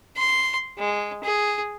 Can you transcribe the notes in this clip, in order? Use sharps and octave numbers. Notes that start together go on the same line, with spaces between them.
C6
G#3
G#4